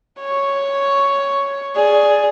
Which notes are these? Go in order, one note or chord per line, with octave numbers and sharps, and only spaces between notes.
C#5
G#4 D5